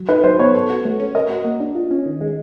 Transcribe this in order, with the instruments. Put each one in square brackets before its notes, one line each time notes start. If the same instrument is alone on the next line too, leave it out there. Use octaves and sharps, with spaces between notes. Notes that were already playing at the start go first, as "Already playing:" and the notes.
Already playing: [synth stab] F#3
[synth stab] D#4 [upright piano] B4
[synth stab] F#3 [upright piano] C5
[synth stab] B3 [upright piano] C#5
[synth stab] A4
F#4
A3
C#4
[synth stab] A#4 [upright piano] D#5
[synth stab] F#4
A#3
D4
F4
C#4
D#3
G#3